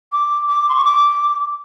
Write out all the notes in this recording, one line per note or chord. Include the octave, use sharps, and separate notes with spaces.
D6
D6
C6
C#6
D6